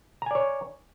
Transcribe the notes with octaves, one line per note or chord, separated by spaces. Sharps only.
C#5 D5 G#5 A#5